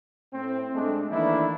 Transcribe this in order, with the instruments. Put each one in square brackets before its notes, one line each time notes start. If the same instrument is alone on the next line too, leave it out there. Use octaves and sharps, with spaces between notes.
[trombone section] A2 C4
G#3 A3 D4
D#3 E3 A3 A#3 D4 E4